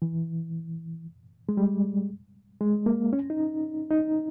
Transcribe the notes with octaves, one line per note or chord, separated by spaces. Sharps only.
E3
G#3
G3
G#3
A#3
C#4
D#4
D#4